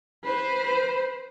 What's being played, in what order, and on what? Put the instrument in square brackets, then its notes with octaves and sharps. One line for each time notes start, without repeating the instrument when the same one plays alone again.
[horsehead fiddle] B4 C5